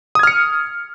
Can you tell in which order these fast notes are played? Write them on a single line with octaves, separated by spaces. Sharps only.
D#6 G#6 F6 C#7